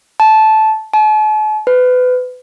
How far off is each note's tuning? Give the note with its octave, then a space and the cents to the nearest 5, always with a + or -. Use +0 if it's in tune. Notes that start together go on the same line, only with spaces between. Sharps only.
A5 -15
A5 -45
B4 +25